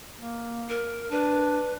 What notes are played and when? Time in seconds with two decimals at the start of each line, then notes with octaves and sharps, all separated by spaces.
0.16 A#3
0.69 A#4
1.11 D4 B4